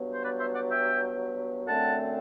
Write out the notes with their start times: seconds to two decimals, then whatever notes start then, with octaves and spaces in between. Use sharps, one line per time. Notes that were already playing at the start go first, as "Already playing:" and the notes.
Already playing: G2 F#3 B3
0.12 C5
0.23 B4 D5
0.39 C5 E5
0.54 D5 F#5
0.70 E5 G5
1.66 F#2 D3 A3 C4 F#5 A5